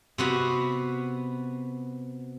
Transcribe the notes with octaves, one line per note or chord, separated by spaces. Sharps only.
C3 B3 F#4